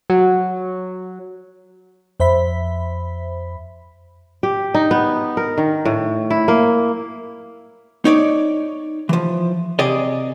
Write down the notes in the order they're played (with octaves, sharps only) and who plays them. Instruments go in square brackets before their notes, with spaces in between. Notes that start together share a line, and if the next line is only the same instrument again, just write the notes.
[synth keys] F#3
[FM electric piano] F2 C5 E5 B5 B6
[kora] G4
D#4
B3
A#4
D#3
A2
E4
A#3
[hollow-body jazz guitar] D#4 C#5 D5
E3 F3
C3 G#4 D5 D#5